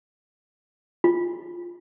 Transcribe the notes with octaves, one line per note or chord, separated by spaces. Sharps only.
F4